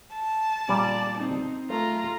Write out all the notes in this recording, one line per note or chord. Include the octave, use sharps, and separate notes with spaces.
A5
A#2 G3 D5
C4 D#4
A3 F4 A#5